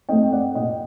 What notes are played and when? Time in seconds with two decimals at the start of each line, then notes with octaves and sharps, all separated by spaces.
0.09 C4 D#5 G5
0.12 A3
0.32 D5 F#5
0.55 A#2 D#5 G5